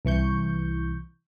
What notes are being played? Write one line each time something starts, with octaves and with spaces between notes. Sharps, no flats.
C2 E3 C#6 G6